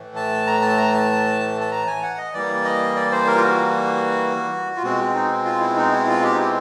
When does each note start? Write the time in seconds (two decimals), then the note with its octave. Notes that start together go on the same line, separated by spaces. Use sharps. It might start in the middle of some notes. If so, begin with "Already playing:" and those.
Already playing: A2 E3 A3
0.16 A5
0.47 A#5
0.62 A5
0.77 A#5
0.94 A5
1.61 A5
1.72 A#5
1.87 G#5
2.03 F#5
2.18 D#5
2.34 E3 G3 A#3 D5
2.65 D#5
2.96 D5
3.12 C5
3.27 A#4
3.36 F4
3.43 F#4
4.76 F4
4.83 B2 G#3 C4 F#4
5.14 D#4
5.45 F4
5.61 E4
5.77 D#4
5.92 E4
6.07 F4
6.23 G4
6.34 D#4
6.38 E4